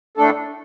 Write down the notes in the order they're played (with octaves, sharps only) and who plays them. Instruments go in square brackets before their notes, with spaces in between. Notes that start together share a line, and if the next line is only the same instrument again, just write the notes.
[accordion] A2 A3 D4 A4